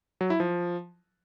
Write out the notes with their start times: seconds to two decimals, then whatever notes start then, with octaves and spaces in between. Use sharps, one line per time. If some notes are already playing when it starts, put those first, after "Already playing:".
0.21 F#3
0.30 E4
0.40 F3